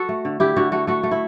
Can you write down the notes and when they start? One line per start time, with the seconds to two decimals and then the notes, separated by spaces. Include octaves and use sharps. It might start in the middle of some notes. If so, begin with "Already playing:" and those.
Already playing: F#4 A4
0.09 A3
0.25 D3
0.40 D3 E4 G4
0.56 D3 F#4
0.72 A3 F#4
0.87 A3 F#4
1.03 A3
1.11 E4